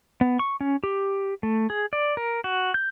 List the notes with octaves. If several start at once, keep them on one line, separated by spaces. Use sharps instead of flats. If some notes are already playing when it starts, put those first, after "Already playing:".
B3
C#6
C#4
G4
A3
G#4
D5
A#4
F#4
G6